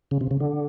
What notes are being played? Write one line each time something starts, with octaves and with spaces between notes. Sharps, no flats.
C#3
C3
C#3
D3